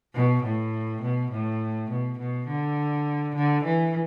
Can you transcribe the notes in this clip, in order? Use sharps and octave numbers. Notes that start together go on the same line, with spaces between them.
B2
A2
B2
A2
B2
B2
D3
D3
E3